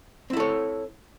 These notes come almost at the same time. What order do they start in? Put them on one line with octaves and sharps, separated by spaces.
C4 E4 A4 C#5